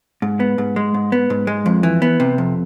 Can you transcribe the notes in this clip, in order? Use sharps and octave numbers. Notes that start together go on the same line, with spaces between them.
G#2
B3
G#2
G#3
G#2
B3
G#2
G#3
F2
E3
B3
C3
F2